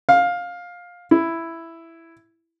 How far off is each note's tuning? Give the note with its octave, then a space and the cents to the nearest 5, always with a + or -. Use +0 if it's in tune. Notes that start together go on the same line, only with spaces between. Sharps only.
F5 +15
E4 +5